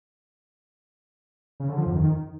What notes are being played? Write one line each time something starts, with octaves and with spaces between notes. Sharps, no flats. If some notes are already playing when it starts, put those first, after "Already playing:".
C#3
D3
F3
F2
D#3